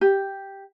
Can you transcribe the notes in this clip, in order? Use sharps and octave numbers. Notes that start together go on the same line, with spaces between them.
G4